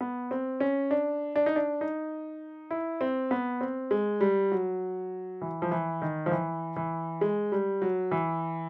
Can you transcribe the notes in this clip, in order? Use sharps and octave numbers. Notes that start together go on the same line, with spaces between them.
B3
C4
C#4
D4
D4
D#4
D4
D#4
E4
C4
B3
C4
G#3
G3
F#3
E3
F3
E3
D#3
F3
E3
E3
G#3
G3
F#3
E3